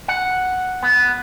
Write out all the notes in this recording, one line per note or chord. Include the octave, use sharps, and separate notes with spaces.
F#5
B3